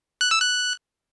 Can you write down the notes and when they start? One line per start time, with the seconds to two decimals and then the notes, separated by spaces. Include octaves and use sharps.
0.21 F#6
0.31 E6
0.42 F#6